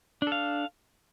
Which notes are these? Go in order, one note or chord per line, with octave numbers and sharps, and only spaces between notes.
D4 A4 F5